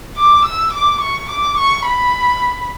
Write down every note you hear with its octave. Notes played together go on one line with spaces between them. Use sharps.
D6
E6
D6
C#6
D6
C#6
B5